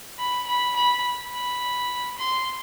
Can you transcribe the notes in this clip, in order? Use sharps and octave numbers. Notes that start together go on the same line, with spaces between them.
B5
B5
B5
B5
C6